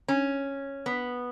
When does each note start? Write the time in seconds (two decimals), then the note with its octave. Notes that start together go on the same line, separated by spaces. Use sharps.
0.08 C#4
0.86 B3